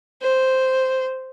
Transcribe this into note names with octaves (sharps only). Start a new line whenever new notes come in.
C5